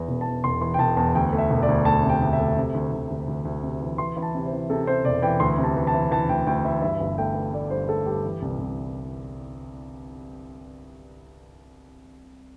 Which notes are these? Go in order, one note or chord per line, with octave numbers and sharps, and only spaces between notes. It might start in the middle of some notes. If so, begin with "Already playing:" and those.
Already playing: E2 E3
E1
A5
E2
E1 C6
E3 C6
G5
E1 A5
E2 A5
D2 G5
A3
E5
E1
D5
D2
A3 A5
C3
G5
D2
E5
A3
C3
D2
D2
D2
D2
D2
C3
E3
E3 C6
E3
A5
C3
C5
E3
C3 A4
C3 C5
E1 D5
E3 G5
D2 C6
C3
A5
E3
A5
E3
E3 A5
D2 G5
D2 G5
E3 E5
G2 E5
G1
A3 G5
A3
A3 D5
G2 C5
A3 A4
G2 G4
E3
C2
C2